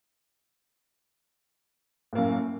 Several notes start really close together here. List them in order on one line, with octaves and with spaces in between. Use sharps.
A2 A#3 F#2